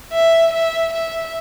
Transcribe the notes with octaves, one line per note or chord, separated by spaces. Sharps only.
E5
E5
E5